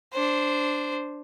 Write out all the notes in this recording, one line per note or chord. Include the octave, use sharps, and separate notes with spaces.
D4 C5